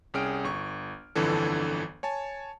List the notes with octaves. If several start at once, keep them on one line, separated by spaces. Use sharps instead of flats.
C2 C#4 G#4 G5 F6 D7
G1 C#6
G1 F2 D3 E3 A4
C#5 G#5 A5